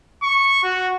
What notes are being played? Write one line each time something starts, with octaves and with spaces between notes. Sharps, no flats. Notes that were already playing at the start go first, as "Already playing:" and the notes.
C#6
F#4